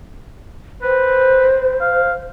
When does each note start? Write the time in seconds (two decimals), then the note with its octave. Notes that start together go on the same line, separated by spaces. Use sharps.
0.82 B4 C5
1.81 F5